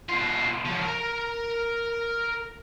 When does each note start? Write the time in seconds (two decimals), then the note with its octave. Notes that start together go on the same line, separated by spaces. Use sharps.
0.09 B2 F4
0.66 F3 F#3
0.82 A#4 A#5